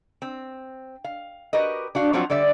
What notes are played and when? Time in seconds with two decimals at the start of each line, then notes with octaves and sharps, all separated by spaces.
0.22 C4
1.04 F5
1.53 F#4 G4 A#4 B4 D#5
1.95 D4 F#4 F5
2.13 F3 F#3 C4 D4 F4 F#4
2.30 D3 G3 D5 E5